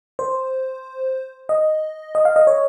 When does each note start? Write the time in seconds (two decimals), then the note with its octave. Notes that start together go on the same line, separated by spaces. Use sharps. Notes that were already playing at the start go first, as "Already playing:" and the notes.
0.19 C5
1.49 D#5
2.15 D#5
2.25 F5
2.36 D#5
2.47 C#5